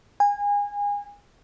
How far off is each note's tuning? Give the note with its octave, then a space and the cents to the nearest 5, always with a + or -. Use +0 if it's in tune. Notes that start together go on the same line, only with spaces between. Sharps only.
G#5 -30